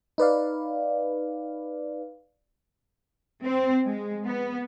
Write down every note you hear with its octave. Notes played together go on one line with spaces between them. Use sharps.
D#4 B4 D5 F5
C4
G#3
B3